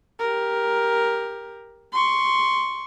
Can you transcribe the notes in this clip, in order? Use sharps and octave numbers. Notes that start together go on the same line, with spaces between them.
G4 A#4
C6 C#6